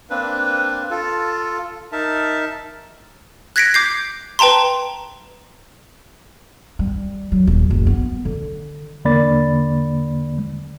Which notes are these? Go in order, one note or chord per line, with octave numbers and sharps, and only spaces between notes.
A#3 C4 D4 B4
F4 A4
D#4 A#4 E5 A5
F#6 G#6 A#6 B6 C#7 D7
D6 G6 C7
B4 G5 A5 A#5 C6
G3
F#3
D#1
F#1
B3
D3
E2 D3 A#3 D5 B5 A6